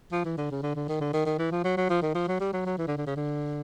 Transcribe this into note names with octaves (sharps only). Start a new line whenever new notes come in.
F3
E3
D3
C#3
D3
D3
D#3
D3
D#3
D#3
E3
F3
F#3
F#3
F3
D#3
F3
F#3
G3
F#3
F#3
E3
D3
D3
C#3
D3